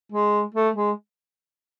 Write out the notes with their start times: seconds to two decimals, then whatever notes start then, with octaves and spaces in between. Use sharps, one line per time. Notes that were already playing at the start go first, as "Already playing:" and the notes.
0.12 G#3
0.54 A3
0.76 G#3